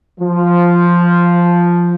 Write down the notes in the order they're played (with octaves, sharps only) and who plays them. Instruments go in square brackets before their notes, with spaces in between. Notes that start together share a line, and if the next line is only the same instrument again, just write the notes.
[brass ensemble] F3